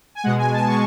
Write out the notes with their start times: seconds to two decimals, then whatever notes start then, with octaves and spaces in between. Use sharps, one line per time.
0.15 G#5
0.23 B2 G#3 F#5
0.38 G#5
0.53 A5
0.68 B2 G#3 C#6